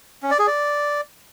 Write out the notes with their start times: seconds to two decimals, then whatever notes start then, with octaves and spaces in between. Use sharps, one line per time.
0.23 C#4
0.31 D5
0.39 G#4
0.47 D5